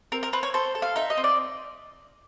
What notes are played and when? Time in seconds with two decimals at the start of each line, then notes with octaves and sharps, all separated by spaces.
0.12 C4 A#4
0.23 A#4
0.33 C4 B4
0.43 C#5
0.54 A4 C5
0.75 A4
0.82 F5
0.96 D#4 E5
1.10 D#5
1.17 C4
1.24 D5